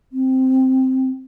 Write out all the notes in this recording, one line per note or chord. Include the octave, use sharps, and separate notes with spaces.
C4